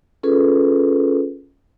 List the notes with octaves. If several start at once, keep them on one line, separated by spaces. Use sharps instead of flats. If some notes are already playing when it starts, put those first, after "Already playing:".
C#4 F4 G#4 A4 B4